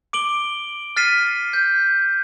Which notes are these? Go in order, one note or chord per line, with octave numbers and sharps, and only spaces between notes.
D6 D7 F#7 G7
F6 A6 B6 C7 D#7
G6